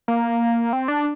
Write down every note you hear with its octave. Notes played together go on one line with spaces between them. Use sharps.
A#3
C4
D4